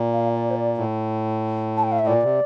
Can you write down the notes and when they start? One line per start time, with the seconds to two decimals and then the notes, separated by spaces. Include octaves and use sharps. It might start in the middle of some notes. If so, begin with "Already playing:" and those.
Already playing: A#2
0.13 F5
0.35 D5
0.51 C5
0.56 D5
0.77 A2
1.77 A5
1.84 G5
1.92 F5
1.99 E5
2.07 A#2 D5
2.23 C3